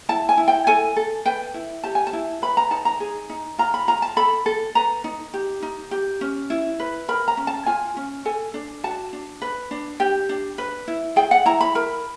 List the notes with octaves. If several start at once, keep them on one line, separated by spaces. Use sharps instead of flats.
E4 A5
G#5
E4
G5
A4 G#5
A4
B4 G5
E4
G4 A5
G#5
A5
E4
B4 B5
A#5
D#4 A5
A#5
G#4
D#4
F4 A#5
B5
F4 A#5
A5
A4 B5
A4
B4 A#5
D#4
G4
D#4
G4
C#4
E4
B4
A#4 B5
A#5
C#4
A5
F4 G#5
C#4
A4 G#5
D4
F#4 A5
D4
B4
D4
G4 G5
D4
B4
E4
G#4 G5
F#5
E4 A#5
B5
A#4 B5